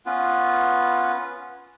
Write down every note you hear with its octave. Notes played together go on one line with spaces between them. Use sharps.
B3 C#4 F4 B4